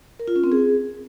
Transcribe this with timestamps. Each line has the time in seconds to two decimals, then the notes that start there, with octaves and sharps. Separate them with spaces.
0.20 A#4
0.28 F4
0.36 C#4
0.44 C4
0.52 G#4